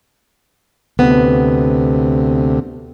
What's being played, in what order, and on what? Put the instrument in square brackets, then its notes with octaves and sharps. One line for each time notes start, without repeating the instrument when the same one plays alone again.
[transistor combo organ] D2 C3 [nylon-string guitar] B3